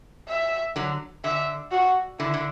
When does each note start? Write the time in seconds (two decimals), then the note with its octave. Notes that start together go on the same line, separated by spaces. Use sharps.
0.28 E5
0.76 D3 F#3
1.24 D3 E5
1.71 F#4
2.19 D3 E4
2.34 D3